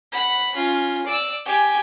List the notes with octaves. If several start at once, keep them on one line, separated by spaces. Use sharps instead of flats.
F#5 B5
C#4 F4
D5 E6
G4 G#5